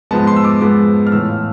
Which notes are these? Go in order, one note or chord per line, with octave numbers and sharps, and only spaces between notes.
G#2 F3 G#3 B3 A5
C6
E6
D6
G#2 F3 G#3 B3 D6
F6
A2 E3 A3 E6
F5